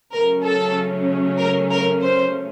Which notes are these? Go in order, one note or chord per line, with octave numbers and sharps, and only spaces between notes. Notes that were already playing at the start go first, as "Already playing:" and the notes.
C#3 F#3 A3 C#4 A#4
A4
A#4
A#4
C5